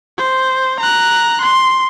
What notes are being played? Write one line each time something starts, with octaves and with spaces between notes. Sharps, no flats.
C5
A#5 F#6
C6